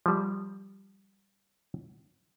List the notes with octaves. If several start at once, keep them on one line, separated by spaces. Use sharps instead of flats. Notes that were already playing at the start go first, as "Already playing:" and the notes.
F3 G3